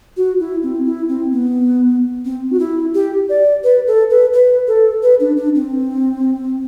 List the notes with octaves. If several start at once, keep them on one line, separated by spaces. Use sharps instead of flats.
F#4
E4
C4
E4
C4
B3
C4
F#4
E4
G4
D5
B4
A4
B4
B4
A4
B4
D4
D4
C4